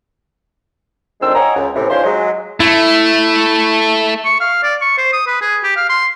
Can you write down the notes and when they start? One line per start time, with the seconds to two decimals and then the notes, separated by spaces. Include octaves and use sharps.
1.21 F2 D#3 G#3 C4 D4 E6
1.35 A#4 C#5 D#5 F#5 G#5 A#5
1.56 C#2
1.75 A2 C3 E3
1.90 D#3 C#4 D4 F4 C5
2.04 F#3 G#3
2.60 A3 E4
4.25 C#6
4.40 F5
4.64 D5
4.81 C#6
4.98 C5
5.13 D#6
5.27 B4
5.41 G#4
5.64 G4
5.77 F5
5.90 C6